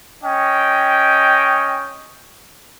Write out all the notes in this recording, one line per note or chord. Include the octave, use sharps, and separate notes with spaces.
C#4 D#5 G5